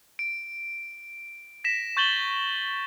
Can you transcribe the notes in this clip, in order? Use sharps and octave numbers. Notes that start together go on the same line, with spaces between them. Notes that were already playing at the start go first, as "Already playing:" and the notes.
D7
A#6 B6 E7
C#6 G6 A6 F#7 G7